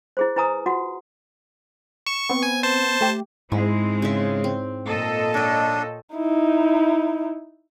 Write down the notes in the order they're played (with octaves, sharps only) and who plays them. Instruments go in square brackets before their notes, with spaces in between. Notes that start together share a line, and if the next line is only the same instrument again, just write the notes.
[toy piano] E4 G#4 C5
E4 B4 G#5 A#5 D#6
F4 F#4 F#5
[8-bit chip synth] C#6 [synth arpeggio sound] C#7 E7
[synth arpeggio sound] B3 C4
[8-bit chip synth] G#5
C5 A5
[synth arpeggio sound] A3 G4
[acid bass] G#2 [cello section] G#3 C4 [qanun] E4
[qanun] C#3 E5
C4
[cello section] A#2 A4 D#5
[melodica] D4 [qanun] C#5 G5
[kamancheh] D#4 E4